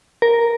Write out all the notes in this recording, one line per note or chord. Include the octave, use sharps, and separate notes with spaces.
A#4